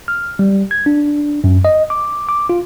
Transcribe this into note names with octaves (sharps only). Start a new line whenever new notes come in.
F6
G3
G#6
D4
F#2
D#5
D6
D6
F4